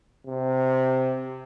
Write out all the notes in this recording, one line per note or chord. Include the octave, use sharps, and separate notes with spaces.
C3